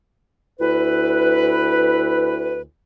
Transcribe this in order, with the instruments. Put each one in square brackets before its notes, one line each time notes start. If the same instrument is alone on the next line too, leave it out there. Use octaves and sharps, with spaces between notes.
[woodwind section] D2 E4 B4